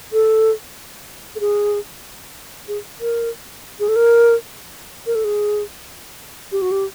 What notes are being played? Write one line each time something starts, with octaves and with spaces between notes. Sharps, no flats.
A4
A4
G#4
G#4
A#4
G#4
A4
A#4
A#4
A4
G#4
G4
F#4
G4